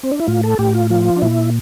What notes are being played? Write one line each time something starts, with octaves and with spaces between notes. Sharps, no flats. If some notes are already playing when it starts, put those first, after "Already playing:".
C4
D4
E4
A2 F4
A4
A2 G4
F4
F3 F4
D4
A#2 E4